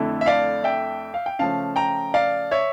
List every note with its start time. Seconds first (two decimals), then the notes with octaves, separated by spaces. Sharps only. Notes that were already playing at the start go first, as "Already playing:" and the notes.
Already playing: F2 D3 A3 E4
0.21 E5
0.26 D5 F5
0.64 E5 G5
1.14 F5
1.26 G5
1.39 C#3 F3 A3 C#4 F5 A5
1.76 G5 A#5
2.14 D5 F5
2.51 C#5 E5